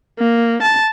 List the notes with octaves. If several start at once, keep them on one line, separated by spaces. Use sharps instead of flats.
A#3
A5